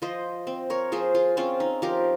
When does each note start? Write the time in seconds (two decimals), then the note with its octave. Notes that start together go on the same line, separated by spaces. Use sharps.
0.02 F3 C5 D#5
0.47 C4
0.70 A#4 C#5
0.92 F3 G#4 C5
1.15 F4 G#4
1.37 C4 C#4 F4
1.60 D#4
1.82 F3 G4 A#4